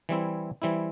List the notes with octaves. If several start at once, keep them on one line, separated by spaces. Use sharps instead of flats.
E3 G3 C4 E4
E3 G3 C4 E4